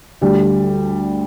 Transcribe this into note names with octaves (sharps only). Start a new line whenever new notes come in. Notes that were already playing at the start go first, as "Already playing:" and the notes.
D2 D3 G3